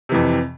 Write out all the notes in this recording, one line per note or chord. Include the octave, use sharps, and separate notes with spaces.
F2 C3 E3